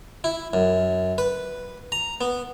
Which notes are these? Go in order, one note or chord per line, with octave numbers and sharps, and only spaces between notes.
E4
F#2
B4
A#5
B3